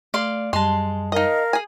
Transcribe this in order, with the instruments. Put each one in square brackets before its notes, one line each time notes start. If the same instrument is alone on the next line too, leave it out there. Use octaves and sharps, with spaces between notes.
[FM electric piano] A3 [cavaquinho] D5 F5 C6
[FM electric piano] F#2 G3 [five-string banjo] G#3 [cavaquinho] A5 C6
[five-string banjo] D#4 D#5 [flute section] A#4 F5
[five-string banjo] G#4 G#5